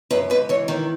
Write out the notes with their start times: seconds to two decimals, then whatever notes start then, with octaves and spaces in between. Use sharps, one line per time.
0.11 F#2 B4
0.30 G#2 B4
0.49 E3 C#5
0.68 D#3